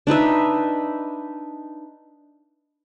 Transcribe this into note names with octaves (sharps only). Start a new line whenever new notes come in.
D4 D#4 B4 E5